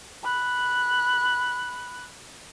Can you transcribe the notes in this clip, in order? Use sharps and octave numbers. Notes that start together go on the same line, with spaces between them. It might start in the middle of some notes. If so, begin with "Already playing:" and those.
B5 F#6